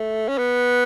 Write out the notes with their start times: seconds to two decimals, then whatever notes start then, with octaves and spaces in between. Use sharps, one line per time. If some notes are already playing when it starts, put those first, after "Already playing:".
Already playing: A3
0.28 C#4
0.38 B3